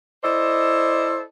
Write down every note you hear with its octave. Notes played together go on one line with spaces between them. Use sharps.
E4 A4 C5 D5 D#5